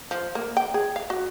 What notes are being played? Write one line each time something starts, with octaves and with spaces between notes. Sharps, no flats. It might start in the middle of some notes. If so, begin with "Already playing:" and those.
F3
A#3
G5
G#4
F5
F#4